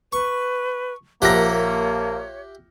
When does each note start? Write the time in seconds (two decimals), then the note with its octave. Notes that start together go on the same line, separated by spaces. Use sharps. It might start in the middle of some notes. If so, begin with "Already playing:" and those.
0.13 B4 C#6
1.22 A#1 A#3 G4 A#4 C#5 E5 F#5 A#6